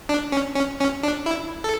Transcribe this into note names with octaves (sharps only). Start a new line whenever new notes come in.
D4
C#4
C#4
C#4
D4
E4
A4